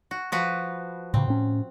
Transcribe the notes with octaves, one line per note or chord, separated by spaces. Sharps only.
F#4
F3 F#4 B4
A2 C#3 C4
A2 C#4